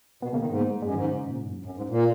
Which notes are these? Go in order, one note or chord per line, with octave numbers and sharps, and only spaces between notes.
B2 B3
C#3 A#3
D#3
G#2 B3
A#3
G#3
F#2 G#3
G#2 D#3
C#3
A#2
G#2
F#2
F#2
G#2
A#2